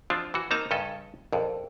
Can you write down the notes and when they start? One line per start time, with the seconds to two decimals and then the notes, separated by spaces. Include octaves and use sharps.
0.10 F3 C4 D4 F4
0.34 E3 F#4
0.51 A#3 C4 D#4 A5 A#5
0.71 G2 C#3 C#4 A4 D#5
1.33 A#1 F2